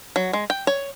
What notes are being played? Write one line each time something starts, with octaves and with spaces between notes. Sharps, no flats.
F#3
G#3
G5
C#5